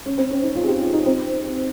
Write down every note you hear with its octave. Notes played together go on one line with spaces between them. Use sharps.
C#4
C4
C#4
D#4
F4
G#4
G4
F4
D#4
C4